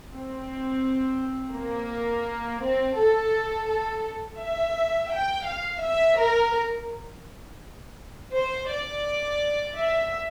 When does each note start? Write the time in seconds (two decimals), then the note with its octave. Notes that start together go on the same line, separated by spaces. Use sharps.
0.12 C4
1.55 A#3
2.63 C4
2.97 A4
3.69 A4
4.41 E5
5.12 G5
5.48 F5
5.83 E5
6.20 A#4
8.34 C5
8.70 D5
9.77 E5